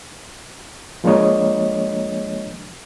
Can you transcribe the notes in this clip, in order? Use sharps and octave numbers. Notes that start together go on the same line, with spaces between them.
F3 G#3 A#3 D4 C#5 D#5